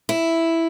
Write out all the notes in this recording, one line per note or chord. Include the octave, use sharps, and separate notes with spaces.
E4